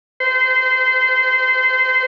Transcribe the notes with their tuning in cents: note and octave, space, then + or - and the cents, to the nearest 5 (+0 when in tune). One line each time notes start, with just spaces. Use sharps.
C5 -25